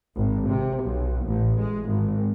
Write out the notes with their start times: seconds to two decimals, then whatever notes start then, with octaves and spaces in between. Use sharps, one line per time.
0.16 G#1
0.47 C3
0.83 B1
1.26 A1
1.59 G#3
1.89 G#1